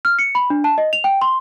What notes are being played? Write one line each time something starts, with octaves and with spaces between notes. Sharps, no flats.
F6
C#7
B5
D4
A5
D#5
F7
G5
C6